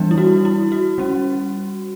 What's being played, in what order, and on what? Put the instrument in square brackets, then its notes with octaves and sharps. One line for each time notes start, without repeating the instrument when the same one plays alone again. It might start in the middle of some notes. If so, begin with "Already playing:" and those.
Already playing: [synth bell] E3 G3 B3 D4
E4
F#4
E4
F#4
G3 C#4